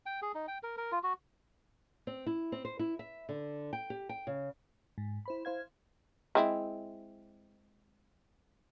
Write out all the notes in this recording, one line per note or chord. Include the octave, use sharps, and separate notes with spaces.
G5
G#4
D#4
G5
A#4
A#4
F4
F#4
C4
E4
C4
C5
E4
E5
D3
G5
G4
G5
C#3
G#2
E4 C5 B5
E4 C5 F5 G#6
G#3 C4 E4